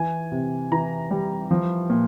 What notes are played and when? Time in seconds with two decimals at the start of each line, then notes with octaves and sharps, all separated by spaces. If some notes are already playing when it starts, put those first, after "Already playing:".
Already playing: E3 G#5
0.32 C3
0.72 E3 A#5
1.11 G3
1.51 F3
1.90 A#2